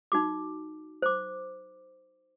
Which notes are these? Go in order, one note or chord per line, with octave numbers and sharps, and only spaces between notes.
D#4 F#4 D6
C5 D6